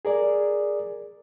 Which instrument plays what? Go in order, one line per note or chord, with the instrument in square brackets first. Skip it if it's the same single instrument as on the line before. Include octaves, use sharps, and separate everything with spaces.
[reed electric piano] G#4 A#4 D5